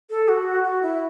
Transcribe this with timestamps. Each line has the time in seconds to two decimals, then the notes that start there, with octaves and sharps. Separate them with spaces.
0.10 A4
0.28 F#4
0.64 F#4
0.82 E4